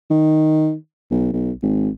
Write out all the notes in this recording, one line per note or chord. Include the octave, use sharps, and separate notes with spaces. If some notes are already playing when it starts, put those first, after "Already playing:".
D#3
B1
B1
G#1